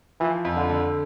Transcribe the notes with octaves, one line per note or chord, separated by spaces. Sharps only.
E3 F3
F2
D3
D3